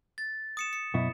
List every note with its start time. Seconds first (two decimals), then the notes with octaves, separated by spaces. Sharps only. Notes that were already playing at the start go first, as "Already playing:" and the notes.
0.18 A6
0.57 D#6 C#7 E7
0.73 C#7
0.94 F#2 B2 E4